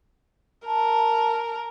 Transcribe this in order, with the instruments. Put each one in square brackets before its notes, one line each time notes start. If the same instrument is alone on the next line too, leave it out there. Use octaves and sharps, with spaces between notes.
[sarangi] A#4 [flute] A5